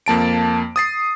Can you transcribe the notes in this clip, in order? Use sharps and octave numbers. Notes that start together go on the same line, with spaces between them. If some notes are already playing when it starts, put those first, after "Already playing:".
F2 A#3 A5 D7
D#6 A6 C7